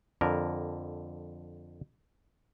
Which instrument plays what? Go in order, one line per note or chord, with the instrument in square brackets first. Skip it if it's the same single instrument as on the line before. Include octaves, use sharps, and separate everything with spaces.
[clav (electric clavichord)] F2 D3 A#4